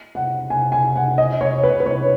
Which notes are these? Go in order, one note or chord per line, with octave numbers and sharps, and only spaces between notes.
F#5
G#5
G#5
F#5
D#5
C#5
B4
B4
C#5